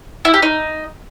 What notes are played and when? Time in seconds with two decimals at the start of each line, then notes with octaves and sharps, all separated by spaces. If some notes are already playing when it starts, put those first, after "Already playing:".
0.25 E4
0.34 G4
0.42 D#4